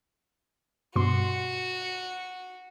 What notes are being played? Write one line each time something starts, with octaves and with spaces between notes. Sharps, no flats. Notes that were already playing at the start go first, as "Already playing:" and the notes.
G2 B2 F#4 C6